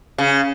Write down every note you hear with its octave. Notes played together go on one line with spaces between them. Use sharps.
C#3